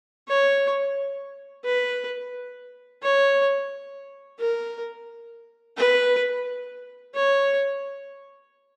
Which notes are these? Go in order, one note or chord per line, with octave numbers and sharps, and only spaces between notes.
C#5
B4
C#5
A#4
B4
C#5